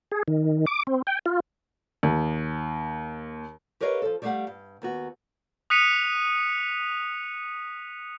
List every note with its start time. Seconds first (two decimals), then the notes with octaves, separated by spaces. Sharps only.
0.12 G#4
0.28 D#3
0.67 D6
0.87 C4
1.07 G5
1.26 F4
2.03 D#2
3.81 G4 A#4 B4 C#5 D#5 F5
4.02 F3 A4
4.22 G3 A3 G4 D#5 F5 F#5
4.47 G2
4.82 D#2 B3 F#4
5.70 D#6 F#6 B6 C#7 D#7 F7